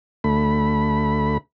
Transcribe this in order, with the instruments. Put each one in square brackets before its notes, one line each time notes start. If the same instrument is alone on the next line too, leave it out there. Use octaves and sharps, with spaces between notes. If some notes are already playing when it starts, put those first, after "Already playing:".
[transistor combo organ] D2 A3 B5